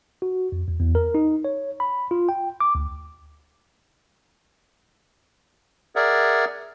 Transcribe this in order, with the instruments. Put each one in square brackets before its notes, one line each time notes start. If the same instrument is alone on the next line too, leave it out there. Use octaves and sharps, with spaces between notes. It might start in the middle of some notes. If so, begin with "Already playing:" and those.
[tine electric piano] F#4
F2
E2
E2
A#4
D#4
C#5
B5
F4
G5
D6
D2
[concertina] G#4 A#4 D5 E5 F#5